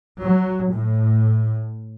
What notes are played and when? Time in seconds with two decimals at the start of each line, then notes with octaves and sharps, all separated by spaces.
0.22 F#3
0.74 A2